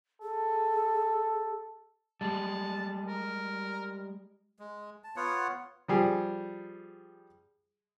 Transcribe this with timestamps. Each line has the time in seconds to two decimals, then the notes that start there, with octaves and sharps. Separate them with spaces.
0.22 G#4 A4
2.21 G3 G#3 A5
3.08 A#4
4.59 G#3
5.04 A5
5.16 B3 F4 C#5 F#5
5.88 F3 G3 G#4